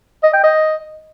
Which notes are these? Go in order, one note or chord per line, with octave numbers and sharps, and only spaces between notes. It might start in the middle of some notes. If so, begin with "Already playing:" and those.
D#5
G5
D#5